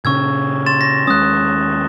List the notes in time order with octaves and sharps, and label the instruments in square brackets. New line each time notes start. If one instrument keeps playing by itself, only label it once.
[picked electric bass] A#2 C#3 C#4 [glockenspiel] C#6 E6 G#6
[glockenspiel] C6 A6 E7
A#6
[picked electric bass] D#2 G#3 C#4 [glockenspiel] D#6 F#6